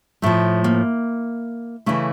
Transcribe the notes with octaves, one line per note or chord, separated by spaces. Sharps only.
A2 F3 A3
A#3
C#3 E3 A3